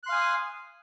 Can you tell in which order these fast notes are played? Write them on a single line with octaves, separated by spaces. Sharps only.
F#6 C6 F5 G#5 D#6